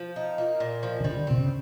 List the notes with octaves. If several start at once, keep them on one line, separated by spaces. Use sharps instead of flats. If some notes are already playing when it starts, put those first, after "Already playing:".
Already playing: F3
D#4
A#3
A#2
F3
C#3
D3 G3
C3 C4
C#3